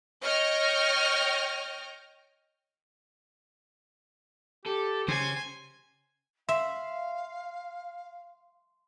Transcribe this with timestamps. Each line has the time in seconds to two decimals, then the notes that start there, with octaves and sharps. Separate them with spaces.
0.22 C#5 D#5 G5 F6 G6 A#6
4.66 G4 A4
5.08 C#3 C5 G#5
6.49 E5 F5 C6